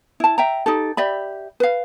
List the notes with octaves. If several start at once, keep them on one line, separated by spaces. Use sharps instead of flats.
E4 A5
E5 G5 A#5
D#4 G4 A4
G4 D5 E5 B5
B4 F5